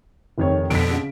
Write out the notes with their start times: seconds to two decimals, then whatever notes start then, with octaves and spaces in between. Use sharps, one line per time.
0.38 F1 D#3 C#5
0.70 F2 B2 D3 B6 D7
0.91 C#3